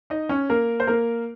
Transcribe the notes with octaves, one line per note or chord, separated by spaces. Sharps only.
D#4 D#5
C#4 C#5
A#3 A#4
C5
A#3 A#4